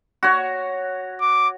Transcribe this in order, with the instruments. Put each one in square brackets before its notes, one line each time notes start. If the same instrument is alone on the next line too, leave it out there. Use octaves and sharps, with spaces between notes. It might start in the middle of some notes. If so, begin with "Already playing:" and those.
[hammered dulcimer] F#4 C#5
[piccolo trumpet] D6